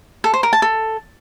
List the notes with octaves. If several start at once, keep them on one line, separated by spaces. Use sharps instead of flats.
A4
C5
A#4
A5
A4